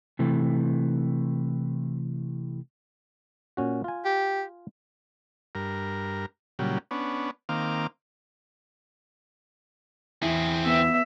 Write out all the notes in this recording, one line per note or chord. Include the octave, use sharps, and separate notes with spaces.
C3 E3 A3
A#2 C#4 F#4
F4 G#5
G4
G2 A#4
A#2 C#3 F#3 G3
B3 C#4 D4
D#3 A#3 C4 F5 D6
E2 C4 E4 G#4
B3 E5